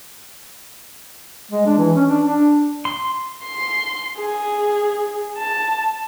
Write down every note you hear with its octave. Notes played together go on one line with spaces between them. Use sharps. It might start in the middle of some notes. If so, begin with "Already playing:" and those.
G#3
D4
E3
C#4
D4
D4
C6
C6
G#4
A5